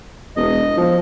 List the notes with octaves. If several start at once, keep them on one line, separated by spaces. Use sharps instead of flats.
E1 D#5
F3